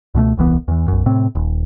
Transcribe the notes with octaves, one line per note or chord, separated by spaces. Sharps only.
C#2 B2 G#3 A3
D#1 C2 E3 B3
E2 E3
B1 F#2
A2 C3 C4
D#1